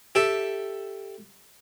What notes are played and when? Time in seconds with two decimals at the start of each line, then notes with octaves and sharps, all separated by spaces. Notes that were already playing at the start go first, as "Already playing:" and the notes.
0.15 G4 A4 E5